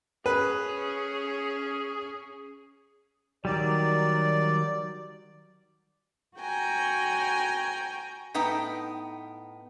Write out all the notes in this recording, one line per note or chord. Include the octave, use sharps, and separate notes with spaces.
C#4 G#4 B4
D#3 F#3 G3 D5
F#4 G5 G#5 A#5
A2 B3 D#4 G5